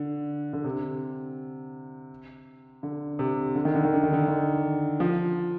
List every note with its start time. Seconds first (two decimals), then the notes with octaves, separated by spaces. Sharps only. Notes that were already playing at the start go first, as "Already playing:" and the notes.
Already playing: D3
0.53 D3
0.64 C3
2.83 D3
3.19 C3
3.55 D3
3.65 D#3
3.75 D3
3.85 D#3
3.94 D3
4.03 D#3
4.13 D3
4.28 D#3
5.00 F3